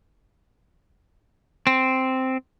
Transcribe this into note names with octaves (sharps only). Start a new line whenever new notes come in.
C4